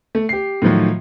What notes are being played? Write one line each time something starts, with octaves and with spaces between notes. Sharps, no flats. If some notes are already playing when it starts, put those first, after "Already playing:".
A3
G4 C7
A2 D#3 F3 F#3